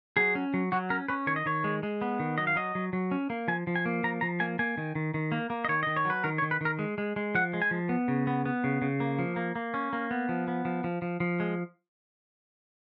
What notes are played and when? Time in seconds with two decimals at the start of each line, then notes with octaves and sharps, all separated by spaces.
0.17 F#3 G#4
0.35 C#4
0.54 F#3
0.72 F#3 F#4
0.90 C#4 A#4
1.08 C#4 B4
1.27 D#3 C#5
1.36 D#5
1.46 D#3 C#5
1.64 G#3
1.83 G#3
2.02 B3
2.20 D#3
2.38 F#3 D#5
2.47 F5
2.56 F#3 D#5
2.75 F#3
2.93 F#3
3.11 C#4
3.30 A#3
3.48 F3 G#5
3.67 F3
3.76 G#5
3.86 A#3
4.04 F3 A#5
4.21 F3 A#5
4.40 A#3 G#5
4.59 A#3 G#5
4.78 D#3
4.95 D#3
5.14 D#3
5.32 A#3
5.50 A#3
5.65 D#5
5.69 D#3 C#5
5.83 D#3 D#5
5.96 C#5
6.05 F#3 B4
6.24 D#3 A#4
6.38 C#5
6.42 D#3
6.51 B4
6.61 D#3 A#4
6.79 G#3
6.98 G#3
7.16 G#3
7.35 F3 F#5
7.53 G#3
7.62 G#5
7.71 F3
7.89 B3
8.08 C#3
8.27 B3
8.46 B3
8.64 C#3
8.82 C#3
9.00 A#3
9.19 F3
9.36 A#3
9.56 A#3
9.74 C#4
9.93 A#3
10.11 B3
10.29 F3
10.48 B3
10.65 F3
10.84 F3
11.02 F3
11.20 F3
11.40 G#3